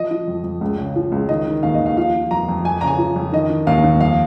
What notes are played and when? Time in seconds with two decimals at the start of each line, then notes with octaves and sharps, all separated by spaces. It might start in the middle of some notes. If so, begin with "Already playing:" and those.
Already playing: F3 D#5
0.11 F3
0.27 F2
0.44 F2
0.61 C#2
0.78 C#3
0.96 F3
1.12 C#2
1.29 D#3 D#5
1.47 D#3
1.63 D#2 F5
1.75 D#5
1.80 D#2
1.86 F5
1.97 F3 F5
2.14 F3
2.31 F2 A#5
2.49 F2
2.65 F2 G#5
2.81 C#3 A#5
2.87 G#5
2.99 F3
3.16 F2
3.32 D#3 D#5
3.50 D#3
3.67 D#2 F5
3.84 D#2
4.01 F2 F5